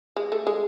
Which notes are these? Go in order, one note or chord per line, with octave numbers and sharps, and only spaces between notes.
G#3
A3
G#3